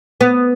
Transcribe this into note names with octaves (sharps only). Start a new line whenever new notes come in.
B3